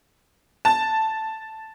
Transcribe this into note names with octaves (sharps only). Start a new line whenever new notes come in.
A5